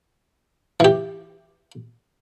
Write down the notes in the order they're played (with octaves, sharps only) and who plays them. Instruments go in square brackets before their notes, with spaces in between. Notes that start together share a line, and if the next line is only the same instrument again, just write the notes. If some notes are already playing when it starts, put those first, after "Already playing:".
[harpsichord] E3 G4